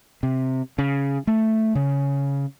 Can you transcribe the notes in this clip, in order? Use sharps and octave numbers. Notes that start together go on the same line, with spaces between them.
C3
C#3
A3
C#3